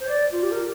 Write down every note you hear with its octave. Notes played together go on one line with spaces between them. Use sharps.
C5
D5
F4
G4
A#4